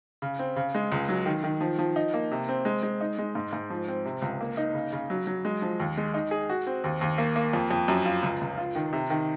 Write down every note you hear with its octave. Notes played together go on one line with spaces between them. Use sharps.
C#3
C4
C#3
G#3
C#2
F#3
D#3
D#3
F3
F3
D#4
A#3
C3
C4
G#3
G#3
D#4
G#3
G#2
G#2
F3
C4
C3
C#2
A#3
D#4
C#3
C#3
F#3
F#3
G#3
F3
D#2
G#3
D#4
G#4
F#4
C4
D#2
D#2
A#3
A#3
F2
F2
F#2
F4
C#2
C#2
F4
D#3
C3
D#3